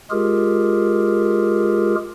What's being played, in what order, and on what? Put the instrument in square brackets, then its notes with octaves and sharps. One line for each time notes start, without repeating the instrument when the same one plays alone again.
[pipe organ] G#3 F4 G4 G#4 A#4